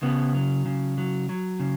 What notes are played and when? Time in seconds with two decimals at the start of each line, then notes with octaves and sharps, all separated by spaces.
0.02 C#3 B3
0.35 F#3
0.66 C#3
0.98 F#3
1.29 F#3
1.60 C#3